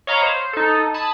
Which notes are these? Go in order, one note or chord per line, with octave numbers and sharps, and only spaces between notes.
C#5 D#5 F5 A#5 B5
C5
D#4 A4
A5 B5 D#6 G#6